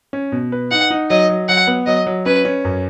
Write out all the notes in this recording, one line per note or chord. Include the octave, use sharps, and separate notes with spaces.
C#4
B2
B4
D#4 F#5
D#4
F#3 D#5
F#3
F#3 F#5
B3
F#3 D#5
F#3
C#4 B4
C#4
F#2